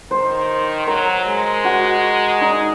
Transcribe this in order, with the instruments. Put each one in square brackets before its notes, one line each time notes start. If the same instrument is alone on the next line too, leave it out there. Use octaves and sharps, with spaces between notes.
[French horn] D#3 [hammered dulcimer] C5
[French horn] F#3 [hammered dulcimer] A#4
[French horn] G#3
[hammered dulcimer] F#4
D#4